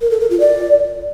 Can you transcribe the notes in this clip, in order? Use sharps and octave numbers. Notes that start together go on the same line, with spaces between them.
A#4
A4
A#4
F4
D5